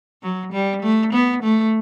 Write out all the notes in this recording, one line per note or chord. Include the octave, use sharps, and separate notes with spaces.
F#3
G3
A3
B3
A3